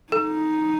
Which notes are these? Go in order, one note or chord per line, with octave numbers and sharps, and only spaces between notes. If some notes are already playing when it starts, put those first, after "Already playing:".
D#4 A4